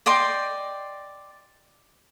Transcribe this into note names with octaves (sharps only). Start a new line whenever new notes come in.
D5 D#5 G5 C6